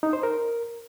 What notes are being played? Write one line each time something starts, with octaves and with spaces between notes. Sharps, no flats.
D#4
C5
A#4